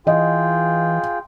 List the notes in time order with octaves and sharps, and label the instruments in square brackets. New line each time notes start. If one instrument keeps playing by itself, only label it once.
[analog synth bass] E3 [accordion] F4 G#4 G5 [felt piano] D#5